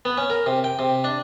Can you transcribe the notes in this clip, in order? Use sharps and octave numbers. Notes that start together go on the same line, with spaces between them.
B3
C#4
A#4
C3
G5
C3
D4